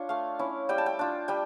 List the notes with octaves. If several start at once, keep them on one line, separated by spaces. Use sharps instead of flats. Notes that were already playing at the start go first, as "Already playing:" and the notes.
Already playing: D4 F4 C#5
A3 F5
C#4 E4
G3 G5
A5
G5
D4 F4
G3 G5